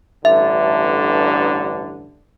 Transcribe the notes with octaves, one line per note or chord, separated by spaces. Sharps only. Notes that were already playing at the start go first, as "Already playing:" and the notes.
A1 G2 D3 E5